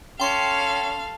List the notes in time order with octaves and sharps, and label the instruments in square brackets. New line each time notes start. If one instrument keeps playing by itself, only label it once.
[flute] C#4 [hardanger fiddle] A4 [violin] F5 [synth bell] G5 C6